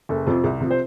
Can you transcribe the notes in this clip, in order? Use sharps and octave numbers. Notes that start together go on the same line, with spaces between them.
F#1 A4
F2 C3 F3
C2
C3 F3
C5